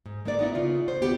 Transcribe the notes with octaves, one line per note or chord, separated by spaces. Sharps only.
G#2
G#3 A#3 D#4 B4 D5
B3 D#4 E4
C#3 B3 F4
C5
D#2 B3 F4 G4